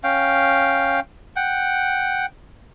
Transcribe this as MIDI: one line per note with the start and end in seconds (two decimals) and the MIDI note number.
0.04 1.00 61
0.04 1.00 77
0.04 1.00 79
1.36 2.26 78
1.36 2.26 79